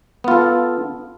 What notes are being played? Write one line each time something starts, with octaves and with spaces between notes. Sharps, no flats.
B3 F4 A4